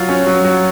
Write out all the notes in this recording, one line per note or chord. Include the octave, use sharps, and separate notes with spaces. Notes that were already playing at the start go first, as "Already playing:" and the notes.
Already playing: F#3 F4
C#4
F#3
F#3